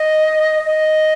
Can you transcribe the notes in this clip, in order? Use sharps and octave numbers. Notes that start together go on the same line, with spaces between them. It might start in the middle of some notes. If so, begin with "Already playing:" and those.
Already playing: D#5
D#5